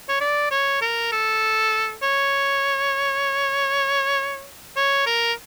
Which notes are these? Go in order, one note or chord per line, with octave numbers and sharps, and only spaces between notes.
C#5
D5
C#5
A#4
A4
C#5
C#5
A#4